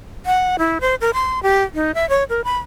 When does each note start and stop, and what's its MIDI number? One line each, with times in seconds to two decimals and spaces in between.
0.26 0.56 78
0.59 0.78 64
0.81 0.95 72
1.01 1.11 70
1.14 1.42 84
1.43 1.64 67
1.74 1.91 63
1.95 2.08 76
2.09 2.24 73
2.29 2.44 70
2.44 2.57 83